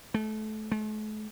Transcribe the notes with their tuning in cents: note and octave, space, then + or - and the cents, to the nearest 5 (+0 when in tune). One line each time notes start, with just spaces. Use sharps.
A3 -25
A3 -45